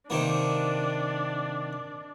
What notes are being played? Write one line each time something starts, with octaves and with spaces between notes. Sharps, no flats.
C3 D#3 A#3 D4